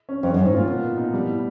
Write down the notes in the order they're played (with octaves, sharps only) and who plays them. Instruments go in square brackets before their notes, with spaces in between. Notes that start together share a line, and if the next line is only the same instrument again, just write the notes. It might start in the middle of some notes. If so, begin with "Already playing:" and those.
[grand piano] C#4
[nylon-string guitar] F2 [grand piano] C#4
[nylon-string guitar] F#2
[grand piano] D#3
[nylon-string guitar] G#2
[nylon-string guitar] A#2 [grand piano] F4
[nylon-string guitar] B2 [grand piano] A#3
[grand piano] A#2
D#4
G3
A2